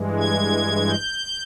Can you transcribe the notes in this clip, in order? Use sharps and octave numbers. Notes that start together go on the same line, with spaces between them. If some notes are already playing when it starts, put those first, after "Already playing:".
Already playing: G2 E3 G#3
G#6
G6